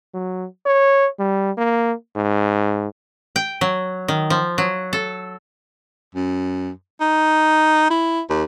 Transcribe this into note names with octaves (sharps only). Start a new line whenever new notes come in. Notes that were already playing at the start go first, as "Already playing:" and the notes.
F#3
C#5
G3
A#3
G#2
G5
F#3
D#3
F3
F#3
A4
F#2
D#4
E4
D#2